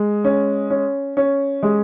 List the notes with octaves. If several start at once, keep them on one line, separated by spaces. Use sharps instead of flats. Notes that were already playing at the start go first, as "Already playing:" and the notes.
Already playing: G#3
C#4
C#4
C#4
G#3